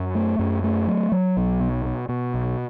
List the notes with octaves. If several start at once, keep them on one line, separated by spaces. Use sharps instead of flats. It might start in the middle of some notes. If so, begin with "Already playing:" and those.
Already playing: F#2
A3
F#2
A3
F#3
F#3
B1
B2
B2
B2
B1